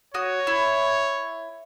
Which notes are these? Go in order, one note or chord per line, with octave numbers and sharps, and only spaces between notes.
F#4 C#5 D#6
E4